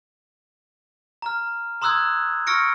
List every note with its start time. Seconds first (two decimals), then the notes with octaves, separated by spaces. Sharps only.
1.22 A#5 F6
1.82 A#5 C6 D#6 E6 F#6 G#6
2.47 C#6 E6 F6 A#6 C#7 D7